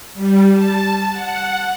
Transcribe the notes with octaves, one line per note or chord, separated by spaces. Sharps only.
G3
A5
F#5